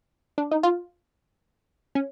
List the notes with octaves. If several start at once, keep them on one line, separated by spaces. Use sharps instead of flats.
D4
D#4
F4
C#4